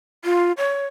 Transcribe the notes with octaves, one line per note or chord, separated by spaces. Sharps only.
F4
C#5